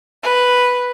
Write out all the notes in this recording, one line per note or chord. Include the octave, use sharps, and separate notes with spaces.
B4